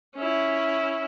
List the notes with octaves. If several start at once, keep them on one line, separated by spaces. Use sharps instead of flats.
C#4 E4